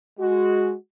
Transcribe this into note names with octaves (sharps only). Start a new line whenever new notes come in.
G#3 F#4